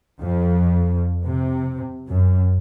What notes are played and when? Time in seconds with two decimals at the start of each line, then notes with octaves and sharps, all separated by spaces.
0.21 F2
1.26 C3
2.09 F#2